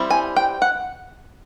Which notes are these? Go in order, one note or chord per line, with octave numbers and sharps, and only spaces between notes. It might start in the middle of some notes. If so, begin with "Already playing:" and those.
Already playing: G3 C4 E4
G#5
G5
F#5